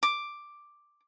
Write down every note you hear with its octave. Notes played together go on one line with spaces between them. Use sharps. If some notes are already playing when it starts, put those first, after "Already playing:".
D6